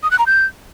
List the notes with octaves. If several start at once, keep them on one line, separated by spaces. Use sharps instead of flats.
D#6
F#6
A#5
G6